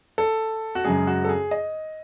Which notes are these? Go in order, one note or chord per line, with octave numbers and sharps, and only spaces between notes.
A4
F#4
F#2 C#3 G#3 G#4
F#4
A4
G#4
D#5